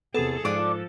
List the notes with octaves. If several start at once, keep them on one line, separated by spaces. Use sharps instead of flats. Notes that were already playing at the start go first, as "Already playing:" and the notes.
E2 C3 B3 G#4 A4
G#2 F3 D4 F4 D6 F#6